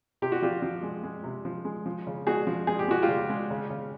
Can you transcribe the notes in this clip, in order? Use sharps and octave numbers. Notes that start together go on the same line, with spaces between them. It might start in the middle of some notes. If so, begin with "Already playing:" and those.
C3 G4
F#4
F3 F4 G4
F3
G#3
G#3
C3
F3
G#3
F3
C#3
G#3 F#4 G#4
F3
G#3 G#4
G4
G#3 F#4
F4 G4
C#3
G#3
C#3
C#3